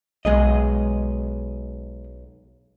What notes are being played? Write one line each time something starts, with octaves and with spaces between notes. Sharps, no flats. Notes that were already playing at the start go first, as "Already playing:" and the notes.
B1 G#3 G#4 D#5